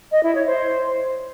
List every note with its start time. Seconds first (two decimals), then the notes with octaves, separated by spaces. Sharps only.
0.12 D#5
0.23 E4
0.35 C#5
0.46 C5